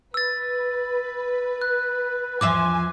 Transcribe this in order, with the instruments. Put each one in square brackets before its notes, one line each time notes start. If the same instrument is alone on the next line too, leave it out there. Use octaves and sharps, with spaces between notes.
[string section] B4 [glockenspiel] E6 A6
[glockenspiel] F#6
[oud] E2 F3 E5 [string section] G#5 [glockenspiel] D6